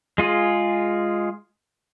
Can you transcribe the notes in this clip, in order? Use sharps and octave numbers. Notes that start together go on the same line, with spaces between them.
G#3 F4 G#4